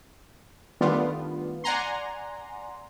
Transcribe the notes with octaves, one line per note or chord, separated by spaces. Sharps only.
D#3 G3 A3 B3 D4 F4
D5 F#5 G#5 A#5 C6